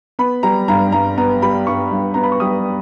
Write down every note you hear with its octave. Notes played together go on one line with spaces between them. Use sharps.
B3 B5
G3 A#5
G2 A#5
G2 A#5
B3 A#5
G3 B5
G2 C#6
G2
B3 A#5
B5
C#6
G3 D#6